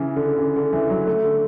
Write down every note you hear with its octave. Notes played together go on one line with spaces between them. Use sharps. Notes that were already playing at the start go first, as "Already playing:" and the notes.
Already playing: C#3 E3
D3
C#3
D3
E3
F#3
A3
D3